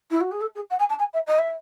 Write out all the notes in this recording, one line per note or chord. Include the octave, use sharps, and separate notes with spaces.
E4
F#4
G#4
A4
G#4
F#5
G#5
A5
G#5
E5
D#5
E5